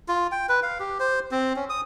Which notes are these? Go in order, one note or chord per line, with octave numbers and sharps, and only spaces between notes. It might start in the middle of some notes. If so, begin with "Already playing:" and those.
F4
G5
B4
F5
G4
C5
C4
C#4
D#6